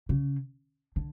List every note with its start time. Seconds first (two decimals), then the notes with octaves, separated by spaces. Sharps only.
0.09 C#3
0.96 D3